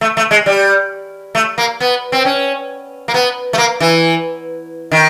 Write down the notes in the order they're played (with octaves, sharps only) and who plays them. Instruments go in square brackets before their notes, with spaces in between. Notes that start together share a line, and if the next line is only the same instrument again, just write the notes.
[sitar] A3
A3
G#3
G3
A3
A#3
B3
C4
C#4
A#3
B3
A3
A#3
E3
D#3